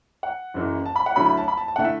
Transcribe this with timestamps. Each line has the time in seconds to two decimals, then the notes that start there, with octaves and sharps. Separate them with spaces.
0.23 F#5
0.54 F#1 F#2 E3
0.86 A5
0.96 B5
1.06 F#5
1.16 D2 D3 F#3 A3 E4 B5
1.26 B5
1.37 A5
1.48 B5
1.57 A5
1.68 A5
1.76 D3 A3 E4 F#5
1.85 E5